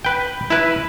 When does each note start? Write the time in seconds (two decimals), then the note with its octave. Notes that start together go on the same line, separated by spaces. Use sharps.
0.05 B4 G5
0.50 E4 B4